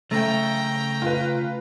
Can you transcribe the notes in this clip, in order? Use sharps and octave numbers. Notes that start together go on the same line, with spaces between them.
C#3 A3 G5 A#5
F4 B4